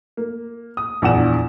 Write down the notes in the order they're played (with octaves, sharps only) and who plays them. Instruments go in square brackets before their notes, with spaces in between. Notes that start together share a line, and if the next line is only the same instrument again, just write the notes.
[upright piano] A#3
D#6
A#1 E2 D4 F#5 E7